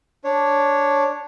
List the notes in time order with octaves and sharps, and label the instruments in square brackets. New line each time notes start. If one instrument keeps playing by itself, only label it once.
[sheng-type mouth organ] D4 C#5